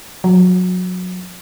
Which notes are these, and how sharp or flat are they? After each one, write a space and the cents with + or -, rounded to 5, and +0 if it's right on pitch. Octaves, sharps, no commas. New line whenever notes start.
F#3 -25